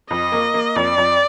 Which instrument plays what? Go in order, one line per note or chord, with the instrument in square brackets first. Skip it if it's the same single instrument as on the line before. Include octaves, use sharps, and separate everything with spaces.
[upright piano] F2 [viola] D#5
[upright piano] A#3
A#3
[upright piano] F2 [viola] D5
[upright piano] F2